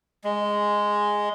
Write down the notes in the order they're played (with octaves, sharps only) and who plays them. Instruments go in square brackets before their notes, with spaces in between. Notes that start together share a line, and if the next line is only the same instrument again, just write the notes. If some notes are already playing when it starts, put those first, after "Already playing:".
[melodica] G#3